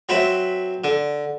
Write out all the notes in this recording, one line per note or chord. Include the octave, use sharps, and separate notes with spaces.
F#3 C4 B4 E5
D3